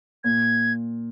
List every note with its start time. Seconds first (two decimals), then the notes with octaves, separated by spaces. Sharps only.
0.24 A#2 G#6